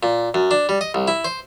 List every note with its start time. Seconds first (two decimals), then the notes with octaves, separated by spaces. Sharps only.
0.03 A#2
0.34 F#2
0.51 D4
0.69 G3
0.81 D#5
0.94 C2
1.08 E4
1.25 C5